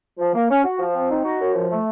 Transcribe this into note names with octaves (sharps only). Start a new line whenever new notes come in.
F3
A#3
C#4
F#4
F3
C4
D#4
F#4
F#2
F3
A3